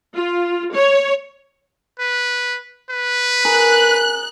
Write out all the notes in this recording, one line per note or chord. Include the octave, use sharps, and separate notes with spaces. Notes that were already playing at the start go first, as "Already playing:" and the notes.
F4
C#5
B4
B4
G#4 A#4 F#6